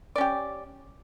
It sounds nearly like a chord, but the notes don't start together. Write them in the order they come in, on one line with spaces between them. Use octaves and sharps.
D5 C#4 G4